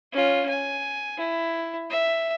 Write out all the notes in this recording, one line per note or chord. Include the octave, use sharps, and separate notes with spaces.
C#4 F4
G#5
E4
E5